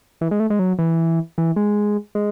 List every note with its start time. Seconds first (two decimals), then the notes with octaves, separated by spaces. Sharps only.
0.21 E3
0.31 G#3
0.40 A3
0.50 G#3
0.59 F#3
0.79 E3
1.38 E3
1.56 G#3
2.15 G#3